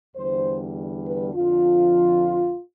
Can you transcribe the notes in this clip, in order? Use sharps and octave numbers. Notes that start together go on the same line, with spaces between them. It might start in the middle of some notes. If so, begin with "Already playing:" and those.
E2 D3 G3 C5
B4
F2 D3 F3 F4